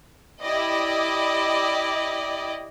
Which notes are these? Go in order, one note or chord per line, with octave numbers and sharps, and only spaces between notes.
E4 G4 D5 D#5